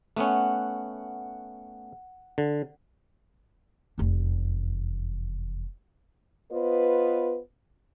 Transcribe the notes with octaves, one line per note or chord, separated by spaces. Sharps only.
A3 B3 C#4 F#5
D3
F1 E2
B3 F4 B4 C5 D#5